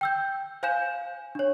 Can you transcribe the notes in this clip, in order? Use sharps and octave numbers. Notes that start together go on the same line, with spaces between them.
G5 E6 G6
C5 F5 G#5 G6 E7
D4 C#5